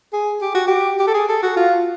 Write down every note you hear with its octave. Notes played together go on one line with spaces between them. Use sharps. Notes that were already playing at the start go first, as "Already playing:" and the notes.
G#4
G4
F#4
G4
G4
A4
G#4
A4
F#4
F4